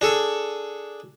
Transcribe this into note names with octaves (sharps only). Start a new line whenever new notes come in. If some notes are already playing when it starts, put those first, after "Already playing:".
D4 G#4 A4